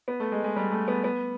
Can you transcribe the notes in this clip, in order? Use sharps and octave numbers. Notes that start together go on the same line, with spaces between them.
B3
A3
G#3
G#3
G3
A3
B3
B3